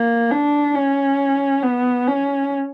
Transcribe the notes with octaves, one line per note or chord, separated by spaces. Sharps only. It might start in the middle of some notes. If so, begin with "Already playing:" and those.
Already playing: A#3
D4
C#4
B3
C#4